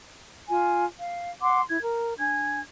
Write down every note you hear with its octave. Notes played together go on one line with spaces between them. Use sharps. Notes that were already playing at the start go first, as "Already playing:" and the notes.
F4 G#5
F5
F#5 C6 D6
E4 G#6
A#4
D4 G#5 G#6